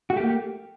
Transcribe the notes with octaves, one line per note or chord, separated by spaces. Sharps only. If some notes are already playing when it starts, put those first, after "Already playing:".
A3 A#3 F#4 G4